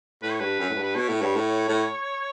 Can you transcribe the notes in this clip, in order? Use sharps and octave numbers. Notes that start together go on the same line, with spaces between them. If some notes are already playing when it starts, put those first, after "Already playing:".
A2 B4
C#5
G2 B4
F#2
A2
G2
B4
B2 C#5
A2
G2
A2
A2